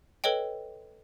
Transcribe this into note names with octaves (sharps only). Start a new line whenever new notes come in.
A4 B4 C#5 D#5 G5